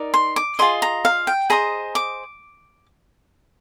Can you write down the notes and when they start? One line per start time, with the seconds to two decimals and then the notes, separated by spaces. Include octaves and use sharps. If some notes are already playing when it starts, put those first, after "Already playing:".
Already playing: D#4 A#4 D5
0.14 C6
0.36 D6
0.59 F4 G#4 D#5 C6
0.82 A#5
1.05 F5
1.27 G5
1.50 G#4 C5 D#5 A#5
1.95 D6